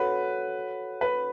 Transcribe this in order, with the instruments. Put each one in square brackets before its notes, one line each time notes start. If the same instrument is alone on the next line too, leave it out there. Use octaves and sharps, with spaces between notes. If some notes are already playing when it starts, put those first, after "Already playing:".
Already playing: [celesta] F#4 A4 C#5 F#5 [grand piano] B4
[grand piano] B4